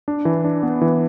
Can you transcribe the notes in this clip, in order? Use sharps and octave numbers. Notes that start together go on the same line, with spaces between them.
D4
E3
D4
B3
E3